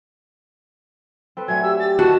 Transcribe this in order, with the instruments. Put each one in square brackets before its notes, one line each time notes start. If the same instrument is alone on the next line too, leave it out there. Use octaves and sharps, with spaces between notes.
[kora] C4 A4 B4
[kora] F#3 A3 D4 [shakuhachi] G#5 [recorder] G#6
[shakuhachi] G4 [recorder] E6
[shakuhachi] G4 [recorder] A6
[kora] D#3 B4 [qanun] F#4 [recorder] A5